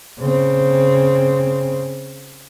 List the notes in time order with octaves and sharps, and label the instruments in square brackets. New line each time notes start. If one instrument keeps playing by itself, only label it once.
[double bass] C#3 C4